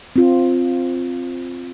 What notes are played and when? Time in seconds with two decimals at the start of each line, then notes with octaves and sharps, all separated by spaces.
0.16 C4 F4